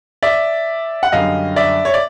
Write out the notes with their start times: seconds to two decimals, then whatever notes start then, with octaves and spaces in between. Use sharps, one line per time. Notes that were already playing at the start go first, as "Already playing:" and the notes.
0.22 D5 E5
1.03 F#5
1.12 F#2 D3 G3 D#5 F5
1.56 D5 E5
1.85 C#5
1.94 D5